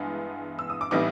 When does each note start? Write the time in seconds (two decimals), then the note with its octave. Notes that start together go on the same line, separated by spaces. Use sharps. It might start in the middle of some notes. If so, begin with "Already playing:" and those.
Already playing: G2 E3 G#3 B3
0.59 E6
0.70 D#6
0.81 D6
0.91 A2 E3 G3 B3 D#4 D6